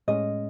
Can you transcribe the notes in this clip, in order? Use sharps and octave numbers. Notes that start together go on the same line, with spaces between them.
A2 G#3 C#4 D#5